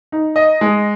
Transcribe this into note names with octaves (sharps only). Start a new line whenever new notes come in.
D#4
D#5
G#3